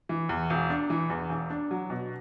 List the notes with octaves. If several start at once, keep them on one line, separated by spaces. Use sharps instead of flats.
E3
E2
E1
D4
E3
E2
E1
D4
F#3
B2